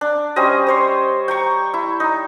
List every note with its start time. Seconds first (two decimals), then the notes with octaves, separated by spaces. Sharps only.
0.01 D4
0.36 G3 C#4 C5 D#5
0.67 C5 C#5 C6
1.28 G5 A#5 C#6
1.74 E4
2.00 D#4